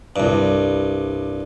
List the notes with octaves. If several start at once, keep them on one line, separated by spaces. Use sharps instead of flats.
C2 G2